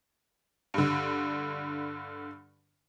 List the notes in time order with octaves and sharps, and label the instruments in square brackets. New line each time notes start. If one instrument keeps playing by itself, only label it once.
[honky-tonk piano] G2 D3